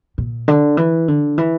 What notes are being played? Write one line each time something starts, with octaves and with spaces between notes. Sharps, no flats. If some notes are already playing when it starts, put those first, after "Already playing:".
A#2
D3
E3
D3
E3